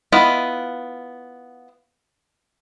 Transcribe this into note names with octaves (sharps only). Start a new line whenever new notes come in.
B3 E4 F4 D#5